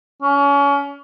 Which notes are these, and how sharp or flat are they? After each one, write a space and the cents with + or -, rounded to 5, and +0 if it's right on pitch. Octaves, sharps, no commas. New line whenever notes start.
C#4 +30